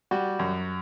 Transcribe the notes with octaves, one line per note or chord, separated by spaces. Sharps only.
G3 F#4
F#2